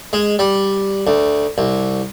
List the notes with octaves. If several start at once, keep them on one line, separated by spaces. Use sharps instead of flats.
G#3
G3
D2
C2